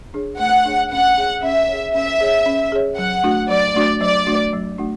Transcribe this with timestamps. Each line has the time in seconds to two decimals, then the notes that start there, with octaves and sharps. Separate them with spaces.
0.14 D4 G#4 C#5
0.39 A3 F#5
0.65 D4 G#4 C#5
0.91 C#4 F#5
1.18 G#4 C#5
1.43 C#4 E5
1.69 G#4 C#5
1.95 C#4 E5
2.21 G#4 C#5
2.46 C#4
2.72 G#4 C#5
2.97 F#3 F#5
3.23 A3 D4 F#4
3.50 F#3 D5
3.75 A3 D4 F#4
4.01 F#3 D5
4.26 A3 D4 F#4
4.53 F#3
4.78 A3 D4 F#4